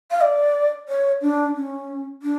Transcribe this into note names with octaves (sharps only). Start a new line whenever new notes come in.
F5
D5
C#5
D4
C#4
D4